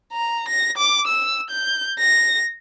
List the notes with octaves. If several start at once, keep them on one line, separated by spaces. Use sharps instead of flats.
A#5
A#6
D6
E6
G6
A#6